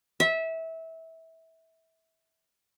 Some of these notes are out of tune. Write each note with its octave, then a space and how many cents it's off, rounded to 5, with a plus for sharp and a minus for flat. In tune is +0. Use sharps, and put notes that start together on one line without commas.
E5 -20